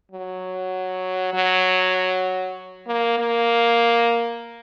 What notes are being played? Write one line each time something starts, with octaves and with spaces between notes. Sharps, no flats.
F#3
F#3
A#3
A#3